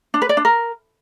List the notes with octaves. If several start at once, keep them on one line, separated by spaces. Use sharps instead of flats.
D4
B4
D5
D4
A#4